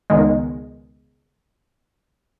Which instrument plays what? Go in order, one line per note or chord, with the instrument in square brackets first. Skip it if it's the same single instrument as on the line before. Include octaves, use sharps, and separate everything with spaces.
[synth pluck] C#2 B2 D#3 G#3